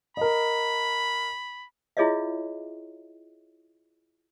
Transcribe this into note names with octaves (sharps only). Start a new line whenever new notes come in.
A#4 D#5 B5
E4 F4 G#4 C#5 D#5 E5